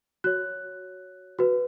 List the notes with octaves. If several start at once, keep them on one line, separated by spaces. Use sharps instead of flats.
F#4 C#5 F#6
F#4 B4